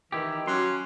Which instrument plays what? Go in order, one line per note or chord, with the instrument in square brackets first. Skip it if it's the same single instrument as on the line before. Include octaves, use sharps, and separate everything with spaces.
[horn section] D#3 E3 [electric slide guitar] E4 G4
[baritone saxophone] F#3 [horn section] C#4 [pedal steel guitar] C6